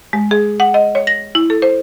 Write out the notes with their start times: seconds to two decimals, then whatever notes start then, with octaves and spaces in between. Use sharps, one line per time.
0.13 G#3
0.31 G#4
0.60 F#5
0.74 D#5
0.95 C#5
1.07 A#6
1.35 E4
1.50 A4
1.62 C5